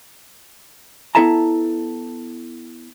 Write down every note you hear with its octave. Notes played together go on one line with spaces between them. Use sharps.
B3 E4 A4 E5 A5 A#5